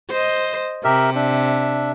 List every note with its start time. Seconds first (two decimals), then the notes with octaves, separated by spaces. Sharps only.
0.11 C5 D#5
0.84 C3 G4 A#4 E5
1.16 D4 E5